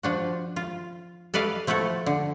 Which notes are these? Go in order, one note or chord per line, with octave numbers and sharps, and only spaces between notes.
F3 D4 F#4
F4
A4 B4 D5 D#5 F5
F3 A3 E4 F#4 A4
D3